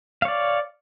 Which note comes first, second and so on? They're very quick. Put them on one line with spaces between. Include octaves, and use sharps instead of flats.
F5 C#5 D5